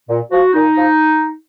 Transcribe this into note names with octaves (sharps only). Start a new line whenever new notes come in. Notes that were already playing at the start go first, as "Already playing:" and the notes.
A#2
F3 F#4
A#2 D#4
F3